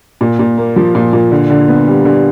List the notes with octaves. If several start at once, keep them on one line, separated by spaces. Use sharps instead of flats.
A#2
A#2
A#3
F3
A#2
A#2
D3
D3
B3
G3
D3